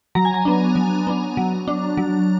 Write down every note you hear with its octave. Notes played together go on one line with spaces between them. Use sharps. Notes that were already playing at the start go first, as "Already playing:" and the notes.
F#3 A#5
G#5
A#5
B3 D4
F#3
B3 D4
F#3
D4
F#3